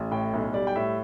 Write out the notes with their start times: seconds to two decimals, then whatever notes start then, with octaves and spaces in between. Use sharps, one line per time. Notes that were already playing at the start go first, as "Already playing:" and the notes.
Already playing: A1
0.11 A2 G5
0.33 B1
0.54 G3 D5
0.67 G5
0.76 A2 E5